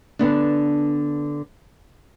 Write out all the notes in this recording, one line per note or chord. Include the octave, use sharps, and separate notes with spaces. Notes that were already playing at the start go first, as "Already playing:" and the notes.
D3 B3 D4